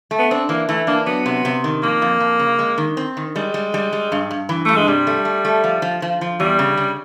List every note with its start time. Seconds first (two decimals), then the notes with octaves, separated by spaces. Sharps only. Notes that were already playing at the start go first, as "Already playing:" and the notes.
0.11 A3
0.19 B3
0.31 C4 D4
0.49 E3 A#3
0.69 E3 A3
0.87 A#3 D4
1.06 F#3 B3
1.26 C3
1.45 C3
1.64 D#3
1.83 F2 A#3
2.02 F2
2.20 F2
2.39 C#3
2.59 G#3
2.78 D#3
2.97 C4
3.17 D#3
3.35 G3 G#3
3.54 G3
3.74 G3
3.93 G3
4.12 G2
4.31 G2
4.49 E3
4.65 G2 A3
4.76 G#3
4.87 C3 G3
5.07 A3
5.25 A3
5.45 A3
5.64 F3
5.82 F3
6.02 F3
6.21 F3
6.40 E2 G3
6.59 C#3
6.77 C#3